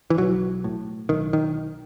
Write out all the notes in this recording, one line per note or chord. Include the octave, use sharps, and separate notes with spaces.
E3
B1 F#3
A2
B1 D#3
D#3